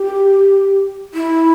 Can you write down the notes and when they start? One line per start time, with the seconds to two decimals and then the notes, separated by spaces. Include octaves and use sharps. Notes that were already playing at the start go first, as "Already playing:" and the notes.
Already playing: G4
1.14 E4